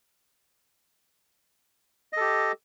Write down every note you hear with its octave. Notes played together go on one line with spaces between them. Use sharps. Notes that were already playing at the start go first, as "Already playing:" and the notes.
G4 A4 D#5